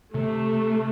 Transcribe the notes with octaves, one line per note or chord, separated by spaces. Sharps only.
C3 A3